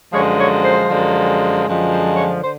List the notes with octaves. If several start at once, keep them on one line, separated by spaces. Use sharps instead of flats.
F#2 D3 F3 G#3 C#5
C#5
C5
F#2 D3 F3 G#3
F#2 D3 F3 G#3
C5
C#5
D3 C5